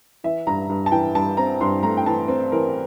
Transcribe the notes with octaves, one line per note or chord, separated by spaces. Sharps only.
E3 E5
G2 A#5
G2
A5
E3 G5
G2 A5
C4 A#5
G2 C6
A3 A#5
G5
E3 A5
C4
E3 A#4